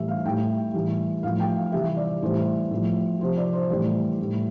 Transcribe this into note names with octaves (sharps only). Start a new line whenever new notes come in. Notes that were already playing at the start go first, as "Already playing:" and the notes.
Already playing: A2 E3 G3 E5
F5
A2 G3 G5
A2 E3 G3
A2 F3 F5
G5
F5
C3 E3 G3 E5
D5
A2 E3 G3 C5
A2 F3
C3 F3 C5
D5
C5
A2 E3 G3 D5
A2 G3